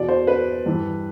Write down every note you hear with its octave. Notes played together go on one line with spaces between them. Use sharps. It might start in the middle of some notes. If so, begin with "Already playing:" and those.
Already playing: E2 B2 D5
C5
B4
G2 E3